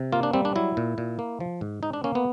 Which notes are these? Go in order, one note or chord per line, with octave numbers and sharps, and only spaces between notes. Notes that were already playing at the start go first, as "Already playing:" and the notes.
Already playing: C3
A#3 F4
D4
G3 C4
D4
F#3 E4
A#2
A#2
A#3
F3
G#2
G#2 D#4
D4
A#3 C#4
B3